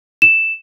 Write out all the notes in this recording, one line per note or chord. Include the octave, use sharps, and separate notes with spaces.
E7